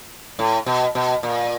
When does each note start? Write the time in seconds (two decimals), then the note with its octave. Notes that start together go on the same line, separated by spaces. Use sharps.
0.39 A2
0.66 B2
0.95 B2
1.23 A#2